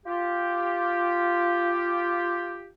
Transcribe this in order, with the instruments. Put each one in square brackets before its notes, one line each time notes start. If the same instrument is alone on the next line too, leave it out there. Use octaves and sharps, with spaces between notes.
[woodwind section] F4 G4